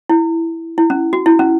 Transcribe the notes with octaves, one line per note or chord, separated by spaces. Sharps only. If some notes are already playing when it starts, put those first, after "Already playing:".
E4
E4
C#4
F#4
E4
C#4